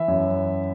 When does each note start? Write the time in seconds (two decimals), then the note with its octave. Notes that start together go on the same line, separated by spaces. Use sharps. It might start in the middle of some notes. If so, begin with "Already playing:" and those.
Already playing: E3 E5
0.08 F#2